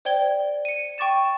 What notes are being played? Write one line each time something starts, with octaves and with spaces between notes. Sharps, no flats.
C5 D5 G5 G#6 G7
C#7 D#7
G5 C#6 D6 A6 E7